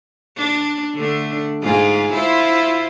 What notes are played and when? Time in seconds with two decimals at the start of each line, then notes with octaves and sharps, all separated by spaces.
0.36 D4
0.94 D3 A3 D4
1.62 G#2 F4 G#4
2.13 E4 F4 C5